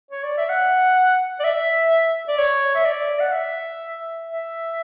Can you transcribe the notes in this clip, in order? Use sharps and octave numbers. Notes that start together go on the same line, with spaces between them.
C#5
D5
E5
F#5
D5
E5
D5
C#5
E5
D5
F#5
E5
E5